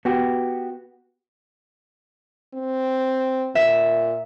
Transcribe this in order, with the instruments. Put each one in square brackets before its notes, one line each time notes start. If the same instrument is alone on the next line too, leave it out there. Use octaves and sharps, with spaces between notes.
[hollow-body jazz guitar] B3 F#4 G4
[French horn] C4
[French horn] A#2 [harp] E5